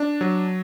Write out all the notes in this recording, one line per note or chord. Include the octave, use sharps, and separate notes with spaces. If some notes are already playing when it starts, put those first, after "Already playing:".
Already playing: D4
F#3